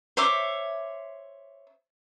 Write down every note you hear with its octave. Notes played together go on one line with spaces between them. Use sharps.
C5 C#5 E5 D6